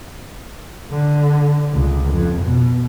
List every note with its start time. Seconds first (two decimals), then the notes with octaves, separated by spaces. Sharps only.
0.91 D3
1.74 C#2
2.13 F2
2.42 B2